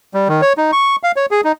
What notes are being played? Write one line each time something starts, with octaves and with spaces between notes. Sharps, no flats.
G3
D#3
C#5
D#4
C#6
F5
C#5
G#4
D#4